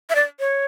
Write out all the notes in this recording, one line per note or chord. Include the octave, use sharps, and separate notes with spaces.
E5
D5
C#5